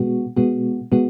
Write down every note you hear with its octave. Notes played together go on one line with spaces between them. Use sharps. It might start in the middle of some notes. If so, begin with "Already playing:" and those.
Already playing: B2 G#3 B3 F#4
B2 G#3 B3 F#4
B2 G#3 B3 F#4